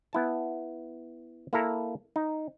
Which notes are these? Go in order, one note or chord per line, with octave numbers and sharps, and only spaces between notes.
B3 E4 A5
A#3 E4 A4 A#5
D#4